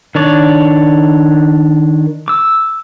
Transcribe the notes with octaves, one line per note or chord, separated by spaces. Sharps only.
D#3 D4 C#5 D5
D6 E6